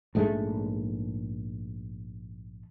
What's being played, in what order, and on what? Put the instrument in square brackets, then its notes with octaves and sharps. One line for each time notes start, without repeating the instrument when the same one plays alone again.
[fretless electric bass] A#1 G#2 G#3 A3